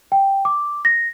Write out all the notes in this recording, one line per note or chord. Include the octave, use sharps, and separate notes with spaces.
G5
D6
A#6